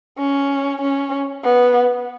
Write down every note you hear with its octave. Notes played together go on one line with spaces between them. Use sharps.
C#4
C#4
B3